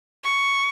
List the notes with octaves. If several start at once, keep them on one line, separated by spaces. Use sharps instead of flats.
C#6